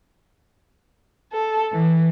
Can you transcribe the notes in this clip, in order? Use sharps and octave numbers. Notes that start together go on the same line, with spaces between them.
A4
E3